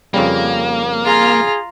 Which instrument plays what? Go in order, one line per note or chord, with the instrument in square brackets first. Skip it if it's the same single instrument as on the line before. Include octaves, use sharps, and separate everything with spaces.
[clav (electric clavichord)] F2 C#3 G3 [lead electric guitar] A#3
[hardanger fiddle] F4 A#5 [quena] G#4